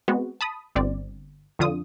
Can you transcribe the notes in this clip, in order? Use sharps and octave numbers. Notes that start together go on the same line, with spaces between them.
G#3 B3 C4 F#4
A5 B5 D#6
G1 C4 D5
F2 D3 F4 D#6